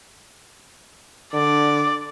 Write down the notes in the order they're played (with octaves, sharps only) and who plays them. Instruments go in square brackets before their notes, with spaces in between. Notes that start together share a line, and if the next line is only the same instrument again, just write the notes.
[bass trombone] D3 [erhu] D5